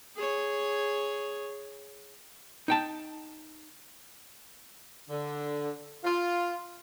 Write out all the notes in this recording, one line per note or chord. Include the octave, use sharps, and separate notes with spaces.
G#4 C#5
D#4 G5 A5
D3
F4